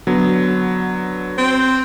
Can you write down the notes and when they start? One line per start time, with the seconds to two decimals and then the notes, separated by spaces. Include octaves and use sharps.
0.07 D3 F#3 B3
1.38 C4